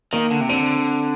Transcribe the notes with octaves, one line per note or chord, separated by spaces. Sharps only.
D#3 A#3
D3
C3
D3 C4